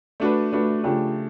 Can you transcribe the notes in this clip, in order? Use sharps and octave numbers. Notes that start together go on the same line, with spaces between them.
A3 D4 F#4 B4
A3 D4 F#4 B4
C#3 F3 A3 D4 G4